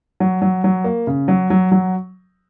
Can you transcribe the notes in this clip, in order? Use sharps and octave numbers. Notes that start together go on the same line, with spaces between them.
F#3
F#3
F#3
A#3
C#3
F#3
F#3
F#3